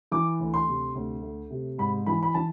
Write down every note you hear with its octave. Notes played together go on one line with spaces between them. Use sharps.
E3 D6
D2
C6
C3
D2
A3
C3
G#2 B5
E3 B5
B5
E3 A5